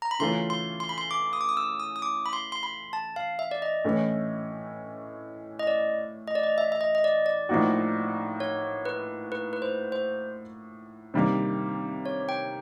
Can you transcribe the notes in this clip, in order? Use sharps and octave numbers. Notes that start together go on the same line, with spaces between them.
A#5
B5
C#3 E3 A3 C#4 F4 C6
C6
C6
B5
C6
D6
D#6
D6
D#6
E6
D#6
D#6
D6
B5
C6
C6
B5
A5
F5
E5
D5
D#5
A2 E3 A3 C#4
D#5
D5
D#5
D5
D#5
E5
E5
D#5
D#5
D5
D5
A2 F3 A#3 D#4 F#4
C#5
B4
B4
B4
C5
C5
C3 D#3 G3 A#3
C#5
G5